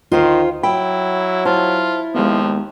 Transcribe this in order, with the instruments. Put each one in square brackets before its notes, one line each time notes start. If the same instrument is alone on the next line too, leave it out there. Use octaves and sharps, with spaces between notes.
[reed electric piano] D2 [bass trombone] D#3 [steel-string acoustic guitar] F4 C5
[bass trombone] F#3 [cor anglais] E4 [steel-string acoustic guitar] G5 [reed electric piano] B5
[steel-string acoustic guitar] E4 [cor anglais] F4 [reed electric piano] C5 A5
[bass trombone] D#2 [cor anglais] F3 [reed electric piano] G#3 B3